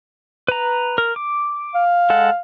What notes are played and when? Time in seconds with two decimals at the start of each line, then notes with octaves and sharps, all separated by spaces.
0.48 B4 A#5
0.98 A#4
1.16 D6
1.75 F5
2.10 G#3 A4 F#5